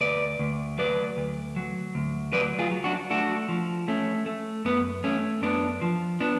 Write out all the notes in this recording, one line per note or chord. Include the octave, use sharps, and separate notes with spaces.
D2 B4 D5
D2
F#3 B4 D5
D2
F#3
D2
F#3 B4 D5
F4 G#4
F#3
D4 F#4
A3 D4 F#4
F3
A3 C#4
A3
F#2 B3
A3 C#4
F#2 B3 D4
F3
B3 D4